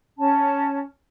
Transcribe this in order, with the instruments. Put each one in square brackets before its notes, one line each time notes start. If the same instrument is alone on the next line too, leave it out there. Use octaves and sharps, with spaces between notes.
[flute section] C#4 A5